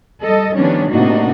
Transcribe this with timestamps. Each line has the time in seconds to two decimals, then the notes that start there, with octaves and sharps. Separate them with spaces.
0.24 G3 A4 D#5
0.56 D#3 F3 G3 B3 C#4 D4
0.92 A2 C3 A#3 D4 D#4 F#4